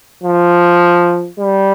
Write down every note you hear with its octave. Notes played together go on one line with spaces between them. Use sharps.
F3
G3